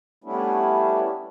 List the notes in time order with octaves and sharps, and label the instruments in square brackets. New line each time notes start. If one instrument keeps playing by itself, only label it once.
[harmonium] G3 A3 B3 C#4 D4 E4